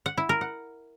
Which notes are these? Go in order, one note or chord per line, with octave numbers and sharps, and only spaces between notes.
F#5
E4
A#4
F#5